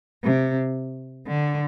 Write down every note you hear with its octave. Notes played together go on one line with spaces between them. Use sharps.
C3
D3